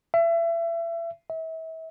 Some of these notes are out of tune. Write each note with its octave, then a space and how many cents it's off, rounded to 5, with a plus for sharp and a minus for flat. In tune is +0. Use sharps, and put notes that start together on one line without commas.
E5 +30
E5 -35